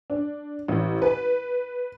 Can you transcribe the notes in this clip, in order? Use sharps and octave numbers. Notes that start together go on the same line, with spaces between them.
D4
A1
B4